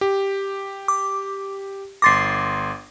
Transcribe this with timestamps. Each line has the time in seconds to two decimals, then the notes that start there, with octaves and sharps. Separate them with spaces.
0.01 G4
0.88 D6
2.02 G1 C6 D6 A6 A#6 C7